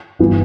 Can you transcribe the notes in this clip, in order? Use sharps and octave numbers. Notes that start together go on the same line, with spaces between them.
G1 E3 B3